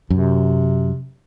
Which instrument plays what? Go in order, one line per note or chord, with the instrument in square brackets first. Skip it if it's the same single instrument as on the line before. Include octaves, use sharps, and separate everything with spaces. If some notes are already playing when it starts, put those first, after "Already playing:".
[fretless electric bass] F#2 [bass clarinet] C3